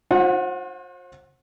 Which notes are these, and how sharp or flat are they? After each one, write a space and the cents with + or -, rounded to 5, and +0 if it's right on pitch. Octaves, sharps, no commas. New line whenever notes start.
F4 +45 C5 +35 F#5 -5